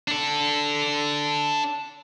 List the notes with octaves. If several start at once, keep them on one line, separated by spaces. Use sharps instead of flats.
D4 A4